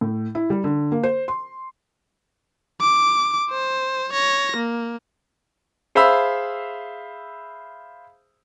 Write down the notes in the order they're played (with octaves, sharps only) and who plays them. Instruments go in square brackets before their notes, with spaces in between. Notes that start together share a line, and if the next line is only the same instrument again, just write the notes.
[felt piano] A2
E4
G3
D3
A#3
C5
C6
[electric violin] D6
C5
C#5 A#6
A#3
[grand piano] G#4 C5 E5 F5 B5 E6